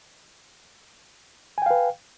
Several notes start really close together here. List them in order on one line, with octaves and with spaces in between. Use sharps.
G#5 G5 F5 B4